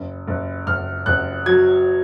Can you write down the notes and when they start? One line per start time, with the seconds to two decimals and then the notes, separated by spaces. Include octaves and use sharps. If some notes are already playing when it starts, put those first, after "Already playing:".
Already playing: F#1
0.28 F#1
0.67 F#1 F6
1.06 F#1 F#6
1.46 F#3 G#6